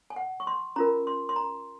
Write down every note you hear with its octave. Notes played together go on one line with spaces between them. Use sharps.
G#5
F#5
C#6
C6
C#4 F4 A#4 A#5
C6
C6
A#5